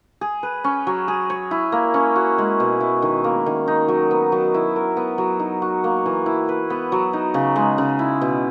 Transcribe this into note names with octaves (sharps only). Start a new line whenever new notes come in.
G#4
B4
C#4
F#3
G#4
C#5
E4
A#3
C#4
F#4
G#3
B2
E4
D#3
A#3
D#3
D#4
F#3
B3
F#3
E4
A#4
B3
F#3
D#4
F#4
A#3
E3
E4
B4
B3
F#3
D#4
C#3
G#3
C#3
E4
B2